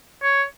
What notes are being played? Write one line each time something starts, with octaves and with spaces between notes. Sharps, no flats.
C#5